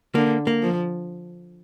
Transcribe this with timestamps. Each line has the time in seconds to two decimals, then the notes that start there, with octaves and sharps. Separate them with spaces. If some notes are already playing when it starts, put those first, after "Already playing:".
0.15 D3 A#3
0.47 A#3
0.62 F3